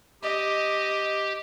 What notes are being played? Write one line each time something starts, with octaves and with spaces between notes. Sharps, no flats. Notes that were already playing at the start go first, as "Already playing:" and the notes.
G4 D#5